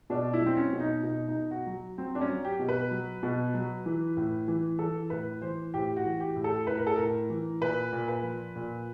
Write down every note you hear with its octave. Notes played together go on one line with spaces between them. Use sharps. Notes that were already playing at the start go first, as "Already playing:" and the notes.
B2 D4
E4
F#3
C4
C#4
B2
D#4
B2 D#4
D#4
B2
F#4
F#3
F#3 C4
D4
C#4
F#3
G4
B2
B4
F#3
B2
F#3
E3
A2
E3
E3 A4
A2 B4
E3 C5
A2 G4
F#4
E3
G4
A2
A4
A2 B4
A#4
A4
A2 A#4
E3
A#2 B4
A#2
B4
F3
A#2